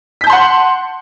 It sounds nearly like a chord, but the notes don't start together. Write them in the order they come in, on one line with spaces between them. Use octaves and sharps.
B6 G6 A5 C6 F#5